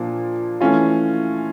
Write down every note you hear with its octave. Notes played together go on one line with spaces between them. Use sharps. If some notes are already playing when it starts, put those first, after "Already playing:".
Already playing: A#2 F3 A#3 D4
E3 A3 C#4 F4